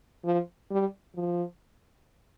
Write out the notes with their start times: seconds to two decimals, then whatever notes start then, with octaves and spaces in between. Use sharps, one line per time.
0.25 F3
0.71 G3
1.16 F3